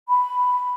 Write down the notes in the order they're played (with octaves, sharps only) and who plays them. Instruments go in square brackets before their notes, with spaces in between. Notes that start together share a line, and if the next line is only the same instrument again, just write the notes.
[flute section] B5